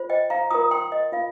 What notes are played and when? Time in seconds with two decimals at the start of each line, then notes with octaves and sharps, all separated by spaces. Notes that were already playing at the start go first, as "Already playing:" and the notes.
Already playing: F4 C5
0.10 D#5 G5
0.30 F5 A#5
0.50 F4 A#4 A#5 D#6
0.71 G5 C6
0.92 D#5
1.12 F4 F5